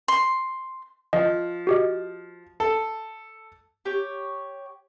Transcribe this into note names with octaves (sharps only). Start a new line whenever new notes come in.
C6
F3 D#5
F#4 G4 D#5
A4
G4 C#5